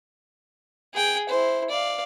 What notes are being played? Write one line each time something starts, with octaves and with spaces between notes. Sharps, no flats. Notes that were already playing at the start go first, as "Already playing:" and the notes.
G#4 G5
E4 C5
D5 F5